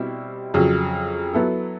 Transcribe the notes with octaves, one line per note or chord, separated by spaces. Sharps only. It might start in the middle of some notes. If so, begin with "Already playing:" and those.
Already playing: B2 G3 C4 E4
F2 C#3 F#3
F#3 B3 E4 A4